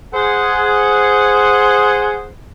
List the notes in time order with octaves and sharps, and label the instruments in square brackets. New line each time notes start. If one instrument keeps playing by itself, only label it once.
[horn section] G#4 C5 F#5